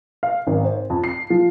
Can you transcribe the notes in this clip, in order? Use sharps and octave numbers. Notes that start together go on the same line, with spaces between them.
F5
G#1
C5
F2
C7
F3